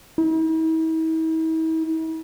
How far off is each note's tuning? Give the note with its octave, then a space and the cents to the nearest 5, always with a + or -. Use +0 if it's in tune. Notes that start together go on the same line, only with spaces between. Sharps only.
E4 -45